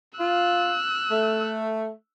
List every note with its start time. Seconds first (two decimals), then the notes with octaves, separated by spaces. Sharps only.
0.19 F4 E6 F#6
1.10 A3